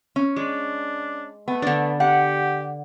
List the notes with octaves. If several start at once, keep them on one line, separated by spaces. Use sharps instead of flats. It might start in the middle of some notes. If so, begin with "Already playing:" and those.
C#4
G#3 D4
A3 B3
D3 D4
G4 F#5